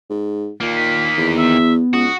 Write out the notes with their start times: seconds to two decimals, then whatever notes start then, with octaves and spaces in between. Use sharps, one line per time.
0.10 G#2
0.60 A#2 D#3 A#3
0.76 B6
1.17 E2
1.37 B3 E5
1.93 C#2 F#4 D#6